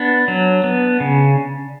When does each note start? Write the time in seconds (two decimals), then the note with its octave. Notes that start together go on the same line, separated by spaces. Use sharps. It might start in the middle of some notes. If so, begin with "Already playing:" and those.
Already playing: B3 D4
0.28 F#3
0.64 B3
1.00 C#3